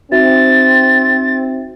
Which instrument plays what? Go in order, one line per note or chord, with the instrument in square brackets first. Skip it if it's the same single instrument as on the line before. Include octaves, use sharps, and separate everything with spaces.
[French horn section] C4 [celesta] D#4 F#4 E5 [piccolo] A6